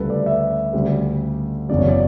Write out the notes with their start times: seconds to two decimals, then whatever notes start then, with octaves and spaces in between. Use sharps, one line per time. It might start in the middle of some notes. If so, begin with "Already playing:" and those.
Already playing: D2 C#3 G3 A4 B4
0.10 D5
0.26 E5
0.73 D2 C#3 G3
1.69 F#1 E2 C#3 F#3 D5
1.79 C#5
1.89 D5